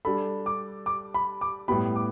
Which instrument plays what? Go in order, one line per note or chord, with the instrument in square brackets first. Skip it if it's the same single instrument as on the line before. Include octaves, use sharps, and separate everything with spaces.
[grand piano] G3 D4 A4 [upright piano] B5
[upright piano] D6
D6
B5
D6
[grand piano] A2 G3 B3 G4 [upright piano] B5
[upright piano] D6